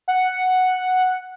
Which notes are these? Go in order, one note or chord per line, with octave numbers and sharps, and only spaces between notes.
F#5